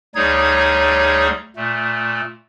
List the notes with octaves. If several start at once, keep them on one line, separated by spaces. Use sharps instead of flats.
D2 G3 D#4 G#4 C#5 G#6
A#2 A3